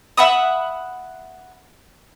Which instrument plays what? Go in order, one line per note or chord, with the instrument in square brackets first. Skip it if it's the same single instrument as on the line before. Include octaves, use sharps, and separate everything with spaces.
[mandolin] E5 F#5 B5 D#6